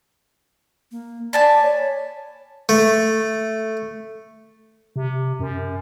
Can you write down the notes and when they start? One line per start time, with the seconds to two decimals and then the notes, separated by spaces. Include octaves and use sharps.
0.91 A#3
1.33 D5 G#5 A5 B5
1.63 C#5
2.69 A3
4.96 C3
5.40 F#2